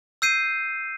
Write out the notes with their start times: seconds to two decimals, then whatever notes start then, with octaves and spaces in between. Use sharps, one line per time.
0.22 E6 G6 C7 D#7